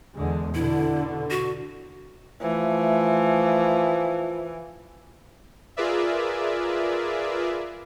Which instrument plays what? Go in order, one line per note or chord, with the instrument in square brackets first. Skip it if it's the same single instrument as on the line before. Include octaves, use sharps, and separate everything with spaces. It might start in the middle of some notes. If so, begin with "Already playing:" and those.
[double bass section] E2 D3 G#3
[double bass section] B2 D3 [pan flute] E4
[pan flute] F#4
[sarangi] E3 [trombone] F3 [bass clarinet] A3
[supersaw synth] F4 G#4 A#4 B4 D5 E5